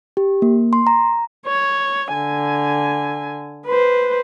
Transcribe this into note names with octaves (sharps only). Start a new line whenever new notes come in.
G4
A#3
C6
A#5
C#5
D3 G#5
B4 C5